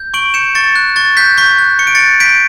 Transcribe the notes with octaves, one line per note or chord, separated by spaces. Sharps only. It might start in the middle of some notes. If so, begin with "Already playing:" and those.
Already playing: G6
C#6 D7 F#7
G6 C#7 E7
C#6 A6 C#7
F#6
C#6 A6
F#6 G6 B6
C#6 G6 B6
F#6
C#6 C#7
D7
F#6 A6 C#7
G6 B6 D7